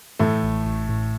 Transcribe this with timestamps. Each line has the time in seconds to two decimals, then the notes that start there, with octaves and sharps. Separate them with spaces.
0.19 A2 E3 A3
0.43 A1
0.65 A1
0.89 A2